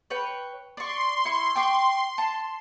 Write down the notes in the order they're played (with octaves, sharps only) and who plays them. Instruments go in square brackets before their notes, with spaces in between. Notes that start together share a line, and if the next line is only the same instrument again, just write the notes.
[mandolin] B4 C#5 G5
[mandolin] D5 C#6 [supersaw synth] C6
[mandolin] E4 C#6
G5 C#6 D6
A5